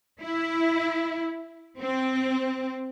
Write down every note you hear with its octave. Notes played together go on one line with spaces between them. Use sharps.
E4
C4